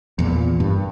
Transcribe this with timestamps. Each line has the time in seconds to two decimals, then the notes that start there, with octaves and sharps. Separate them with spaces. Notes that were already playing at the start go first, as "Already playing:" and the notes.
0.19 E2 A#2
0.60 G2